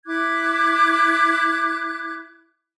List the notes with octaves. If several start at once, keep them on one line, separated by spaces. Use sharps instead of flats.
E4 D6 F#6 G#6